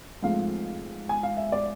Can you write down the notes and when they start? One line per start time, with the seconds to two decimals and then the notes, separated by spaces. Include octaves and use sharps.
0.22 G#2 F3 A3 C4 F5
1.09 G#5
1.23 F5
1.37 E5
1.52 D5